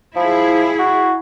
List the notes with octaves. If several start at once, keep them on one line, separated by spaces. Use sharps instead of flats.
F3 E4 G#4
F#4